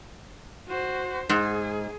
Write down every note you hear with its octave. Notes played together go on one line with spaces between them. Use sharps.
F#4 C5
G#2 G#4